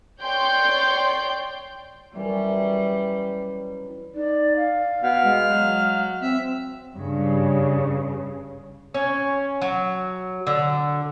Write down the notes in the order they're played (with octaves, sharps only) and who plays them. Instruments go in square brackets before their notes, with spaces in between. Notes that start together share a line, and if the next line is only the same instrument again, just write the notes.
[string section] C#5 D5 G5 C6 G6
[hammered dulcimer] F#2 E3 [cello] G3
[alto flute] D#4 [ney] D5
[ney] F5
[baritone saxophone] B2 [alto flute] F#5 [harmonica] F6
[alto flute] G#3
[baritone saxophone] F#3
[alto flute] C4 [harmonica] E5
[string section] G2 C#3
[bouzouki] C#4
F#3
D3